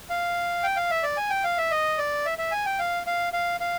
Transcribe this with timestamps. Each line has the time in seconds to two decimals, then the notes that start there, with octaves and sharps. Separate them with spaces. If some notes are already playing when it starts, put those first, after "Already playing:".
0.10 F5
0.63 G5
0.77 F5
0.91 E5
1.03 D5
1.17 G#5
1.30 G5
1.44 F5
1.58 E5
1.71 D#5
1.98 D5
2.25 E5
2.38 E5
2.51 G#5
2.66 G5
2.79 F5
3.07 F5
3.33 F5
3.60 F5